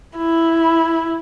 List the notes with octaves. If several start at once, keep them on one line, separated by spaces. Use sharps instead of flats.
E4